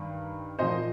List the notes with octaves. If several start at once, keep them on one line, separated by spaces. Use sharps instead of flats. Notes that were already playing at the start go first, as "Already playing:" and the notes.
Already playing: G2 D#3
A#2 F3 C5 D#5